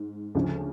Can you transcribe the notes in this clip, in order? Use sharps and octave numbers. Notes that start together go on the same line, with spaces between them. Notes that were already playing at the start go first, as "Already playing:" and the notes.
Already playing: G#2
D2 C#3 F3